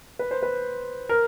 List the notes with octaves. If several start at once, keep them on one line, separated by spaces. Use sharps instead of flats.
B4
C5
B4
A#4